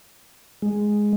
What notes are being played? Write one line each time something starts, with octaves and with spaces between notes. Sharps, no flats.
G#3